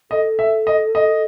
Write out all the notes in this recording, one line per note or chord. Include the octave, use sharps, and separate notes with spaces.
A4 D#5
E5
D#5
D#5